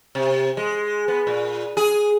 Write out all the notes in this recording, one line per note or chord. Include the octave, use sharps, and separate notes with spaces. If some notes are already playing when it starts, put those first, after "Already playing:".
C3
G#3
B3
A#2
G#4